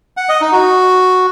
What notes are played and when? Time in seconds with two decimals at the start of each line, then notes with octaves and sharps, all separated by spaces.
0.17 F#5
0.29 D#5
0.41 D#4
0.52 F#4